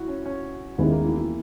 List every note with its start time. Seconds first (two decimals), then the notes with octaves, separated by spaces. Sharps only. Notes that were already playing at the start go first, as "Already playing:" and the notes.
Already playing: E4 F#4
0.08 C#4
0.26 C#4
0.78 D#2 D#3 G#3 B3 C#4 E4
0.91 A#3
1.05 E3
1.18 E3